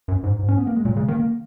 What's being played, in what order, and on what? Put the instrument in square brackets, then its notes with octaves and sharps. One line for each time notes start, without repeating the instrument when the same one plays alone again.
[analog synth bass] F#2
G#2
G#2
[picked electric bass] C#4
B3
A#3
G#3
[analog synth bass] A#2 [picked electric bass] F#3
[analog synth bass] C#3 [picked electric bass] G#3
[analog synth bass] D#3 [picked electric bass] A#3
[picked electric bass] A#3